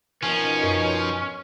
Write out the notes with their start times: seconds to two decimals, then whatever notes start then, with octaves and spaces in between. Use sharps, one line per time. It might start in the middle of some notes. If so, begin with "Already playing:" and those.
0.23 B2 F3 C#4 D#4 A#4
0.63 F#2